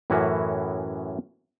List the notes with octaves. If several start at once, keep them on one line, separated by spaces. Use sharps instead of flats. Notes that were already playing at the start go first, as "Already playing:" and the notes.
F#2 A2 E3 C#4 E4 F#4